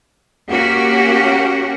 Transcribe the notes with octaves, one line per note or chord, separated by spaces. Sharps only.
A#3 C#4 F#4 G4